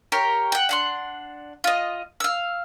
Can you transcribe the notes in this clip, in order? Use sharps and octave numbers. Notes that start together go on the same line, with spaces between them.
G4 A#4 C#5
F#5 G5
D4 F#5 C6
F4 D#5
F5 E6